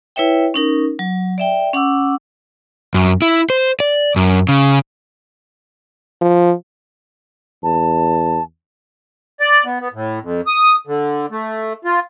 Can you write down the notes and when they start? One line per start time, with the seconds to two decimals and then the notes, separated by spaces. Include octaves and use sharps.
0.16 E4 B4 C#5 E5 G5
0.54 C#4 D#4 A#4
0.99 F#3
1.38 D5 E5 G5
1.73 C#4 F#5 D6 E6
2.94 F#2
3.22 E4
3.50 C5
3.80 D5
4.16 F#2
4.49 C#3
6.22 F3
7.63 E2 A5
9.40 D5
9.65 B3
9.80 B3
9.93 A2
10.22 F2
10.47 D#6
10.87 D3
11.31 A3
11.85 F4